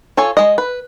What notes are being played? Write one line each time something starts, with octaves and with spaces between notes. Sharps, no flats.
F4 A4 C#5 G#5
G#3 D#5
B4